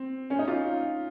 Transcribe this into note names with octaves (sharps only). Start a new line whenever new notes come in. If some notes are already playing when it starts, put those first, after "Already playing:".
Already playing: C4
C#4
D#4
F4